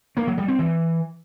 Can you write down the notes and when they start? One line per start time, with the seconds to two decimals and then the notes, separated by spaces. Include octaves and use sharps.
0.17 A#3
0.27 F#3
0.38 G3
0.48 C4
0.59 E3